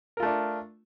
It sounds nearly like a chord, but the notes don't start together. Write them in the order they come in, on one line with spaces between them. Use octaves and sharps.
A#4 F4 A3 D4